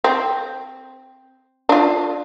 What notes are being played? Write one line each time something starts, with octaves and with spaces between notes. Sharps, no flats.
C4
D4 F4